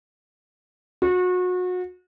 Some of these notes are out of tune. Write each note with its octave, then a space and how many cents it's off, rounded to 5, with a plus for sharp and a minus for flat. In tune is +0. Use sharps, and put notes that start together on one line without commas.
F#4 -30